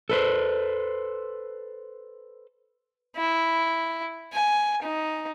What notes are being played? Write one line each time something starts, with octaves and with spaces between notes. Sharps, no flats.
A4 B4 C5
E4
G#5
D#4